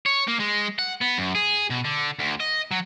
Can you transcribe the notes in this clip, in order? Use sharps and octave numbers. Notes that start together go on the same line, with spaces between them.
C#5
A#3
G#3
F#5
B3
F#2
G#4
B2
D3
D2
D#5
F#3